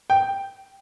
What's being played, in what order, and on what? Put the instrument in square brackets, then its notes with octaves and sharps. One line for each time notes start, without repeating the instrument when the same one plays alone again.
[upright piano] G5